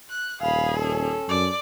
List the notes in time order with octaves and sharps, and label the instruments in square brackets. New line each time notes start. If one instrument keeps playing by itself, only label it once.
[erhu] F#6
[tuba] D#1 [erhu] G#4 [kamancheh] F5 B5
[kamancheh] C#4 A4
[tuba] F#2 [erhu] D5